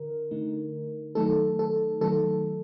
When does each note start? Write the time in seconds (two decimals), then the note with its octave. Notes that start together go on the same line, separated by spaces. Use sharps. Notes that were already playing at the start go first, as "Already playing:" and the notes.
Already playing: D3 A#4
0.31 D3 A3 D#4
1.15 D#3 F#3 A3 D#4 A4
1.59 A4
2.01 D#3 F#3 A3 D#4 A4